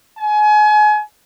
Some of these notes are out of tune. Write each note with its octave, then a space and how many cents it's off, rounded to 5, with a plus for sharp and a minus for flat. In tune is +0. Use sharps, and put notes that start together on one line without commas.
G#5 +30